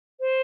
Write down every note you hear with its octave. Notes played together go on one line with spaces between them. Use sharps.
C5